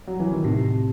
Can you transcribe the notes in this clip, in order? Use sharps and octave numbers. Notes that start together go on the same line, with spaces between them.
F#3
E3
D#3
A2 C3